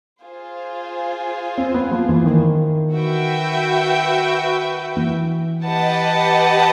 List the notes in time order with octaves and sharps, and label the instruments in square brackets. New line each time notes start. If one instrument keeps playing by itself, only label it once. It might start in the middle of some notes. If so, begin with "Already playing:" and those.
[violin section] F4 G#4 C5
[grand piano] C4
B3
F3
E3
D#3
[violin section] F#4 B4 E5 G5
[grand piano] E3
[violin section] G4 B4 D#5 F#5 A5